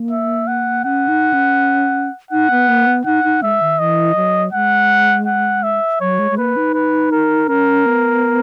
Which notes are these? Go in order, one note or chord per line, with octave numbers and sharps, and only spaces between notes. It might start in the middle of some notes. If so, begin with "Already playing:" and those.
Already playing: A#3
E5
F#5
C#4 F#5
D#4
C#4
D#4 F#5
B3
A#3
B3
D#4 F#5
D#4
G#3 E5
D#3
E3 D#5
F#3
G#3 F#5
F#5
E5
F#3 C#5
G#3
G#3
A#3 B4
D#4
B4
A#4
C#4 A#4
B3